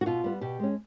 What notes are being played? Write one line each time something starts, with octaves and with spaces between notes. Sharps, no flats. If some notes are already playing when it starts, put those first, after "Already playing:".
F#4
B2 F4
G3 B3
B2 G4
G#3 C#4